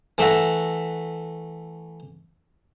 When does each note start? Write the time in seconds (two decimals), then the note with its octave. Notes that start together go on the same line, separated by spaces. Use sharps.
0.18 E3 A3 E5 F#5 A#5